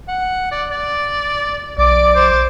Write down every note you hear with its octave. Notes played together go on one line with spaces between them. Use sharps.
F#5
D5
D5
B1 D5 D6
C5